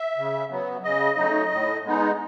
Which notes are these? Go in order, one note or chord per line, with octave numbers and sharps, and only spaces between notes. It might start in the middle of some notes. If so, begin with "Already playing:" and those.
Already playing: E5
C#3
F#3 B3
C#3 D#5
F#3 A3 D#4
A2
G#3 B3 D#4